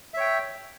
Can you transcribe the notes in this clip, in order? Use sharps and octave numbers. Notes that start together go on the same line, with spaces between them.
C#5 E5 G5